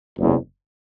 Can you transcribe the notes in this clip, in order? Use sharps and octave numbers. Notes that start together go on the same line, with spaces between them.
F#1 E2 C3